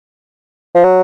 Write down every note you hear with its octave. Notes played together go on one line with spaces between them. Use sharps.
F3
F#3